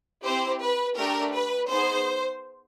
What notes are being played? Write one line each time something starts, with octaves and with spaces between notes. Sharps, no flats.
C4 E4 G4 C5
B4
A3 D4 G4 A#4
B4
B3 D#4 G#4 C5